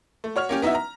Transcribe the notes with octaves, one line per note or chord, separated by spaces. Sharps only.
A3
F#4 C#5 F6 F7
A#3 C#4 G4
B3 D#4 E4 F#4 E5
A#5